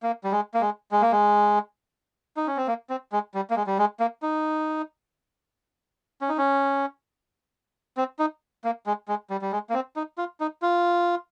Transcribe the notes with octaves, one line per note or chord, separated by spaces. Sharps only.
A#3
G3
G#3
A#3
G#3
G#3
A#3
G#3
D#4
C#4
C4
A#3
C4
G#3
G3
A#3
G#3
G3
G#3
A#3
D#4
C#4
D#4
C#4
C4
D#4
A#3
G#3
G#3
G3
G3
G#3
A#3
C4
D#4
F4
D#4
F4